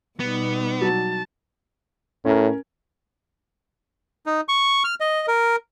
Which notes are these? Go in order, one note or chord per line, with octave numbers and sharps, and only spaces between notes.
B2 G3 B3 D#4
F#3 A5
A2 C#4 A#4
D#4
C#6
F6
D#5
A#4